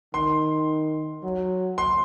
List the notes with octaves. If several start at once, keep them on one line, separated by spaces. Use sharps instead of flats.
D#3 C6
F#3
C6